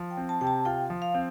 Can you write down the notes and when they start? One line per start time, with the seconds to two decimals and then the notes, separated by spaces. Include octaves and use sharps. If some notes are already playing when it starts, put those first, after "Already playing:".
Already playing: F3
0.10 G5
0.17 C4
0.29 A5
0.41 C3 G5
0.47 A5
0.65 F4 G5
0.90 F3
1.02 F5
1.15 C4